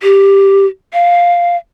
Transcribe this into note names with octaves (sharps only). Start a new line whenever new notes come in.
G4
F5